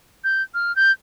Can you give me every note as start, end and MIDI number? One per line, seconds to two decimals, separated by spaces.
0.24 0.42 91
0.54 0.75 89
0.76 0.92 91